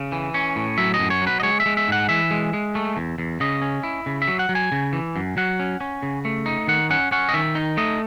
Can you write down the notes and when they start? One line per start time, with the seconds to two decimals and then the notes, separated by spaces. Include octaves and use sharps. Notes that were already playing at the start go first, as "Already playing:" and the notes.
Already playing: C#3
0.12 E3
0.34 C#4
0.56 A2
0.78 F#3 E5
0.94 D#5
0.99 F#2
1.10 C#5
1.22 F#3 B4
1.40 D#5
1.43 G#3 C#5
1.60 E5
1.66 G#3
1.77 E5
1.88 G#2 F#5
2.09 E3 E5
2.31 G#3
2.53 G#3
2.75 A3
2.97 E2
3.18 E2
3.40 C#3 D#5
3.62 C#4
3.83 E4
4.06 C#3
4.22 E5
4.28 F#3
4.39 F#5
4.49 F#3
4.55 G#5
4.72 C#3
4.93 E3
5.16 F#2
5.37 F#3 F#5
5.60 C#4
5.81 C#4
6.03 C#3
6.25 A3
6.46 D#4
6.68 D#3 F#5
6.90 C#4 F#5
7.12 C#4 F#5
7.29 D#5
7.34 D#3 E5
7.55 D#4
7.77 A3 D#5